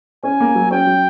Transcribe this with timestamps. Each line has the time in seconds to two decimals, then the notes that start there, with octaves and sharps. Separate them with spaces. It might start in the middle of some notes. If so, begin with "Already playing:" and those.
0.23 C#4 G#5
0.40 A#3
0.55 F#3
0.71 C#4 G5
0.86 F#3